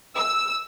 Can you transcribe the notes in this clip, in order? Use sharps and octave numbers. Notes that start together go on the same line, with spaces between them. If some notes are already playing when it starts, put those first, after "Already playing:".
E6